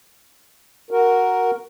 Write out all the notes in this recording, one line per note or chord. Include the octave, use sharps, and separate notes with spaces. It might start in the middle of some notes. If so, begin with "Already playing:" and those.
F#4 A#4